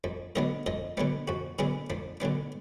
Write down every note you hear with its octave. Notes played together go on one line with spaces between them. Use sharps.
F2
D3 F#3 B3 D4 D#5
F2 D#5
D3 F#3 B3 D4
F2 F#4
D3 F#3 B3 D4 G#4
F2 D4
D3 F#3 B3 D4